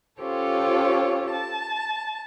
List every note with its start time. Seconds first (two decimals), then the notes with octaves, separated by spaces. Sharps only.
0.20 C#4 F4 G4 A4 C5 C#5
1.30 A5